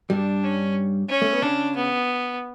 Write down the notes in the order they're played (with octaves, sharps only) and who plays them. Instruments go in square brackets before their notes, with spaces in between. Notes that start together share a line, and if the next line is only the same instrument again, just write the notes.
[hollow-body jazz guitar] G2 G3 [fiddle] D4
[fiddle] C#4
C#4
[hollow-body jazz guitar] A3
B3
[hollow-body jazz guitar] C#3 C#4 [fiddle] D4
[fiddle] B3